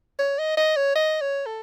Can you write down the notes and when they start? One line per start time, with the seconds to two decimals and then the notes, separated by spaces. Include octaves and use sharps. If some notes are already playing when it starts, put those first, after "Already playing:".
0.19 C#5
0.38 D#5
0.57 D#5
0.76 C#5
0.95 D#5
1.21 C#5
1.46 A4